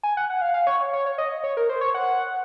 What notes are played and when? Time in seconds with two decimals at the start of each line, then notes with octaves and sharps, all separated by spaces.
0.03 G#5
0.17 F#5
0.30 F#5
0.41 F5
0.54 F5
0.67 C#5
0.80 C#5
0.93 C#5
1.06 C#5
1.18 D#5
1.44 C#5
1.57 A#4
1.69 C5
1.81 C#5
1.94 F#5